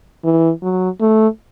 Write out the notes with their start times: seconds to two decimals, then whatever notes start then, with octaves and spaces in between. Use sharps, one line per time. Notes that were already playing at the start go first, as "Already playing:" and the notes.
0.24 E3
0.62 F#3
1.01 A3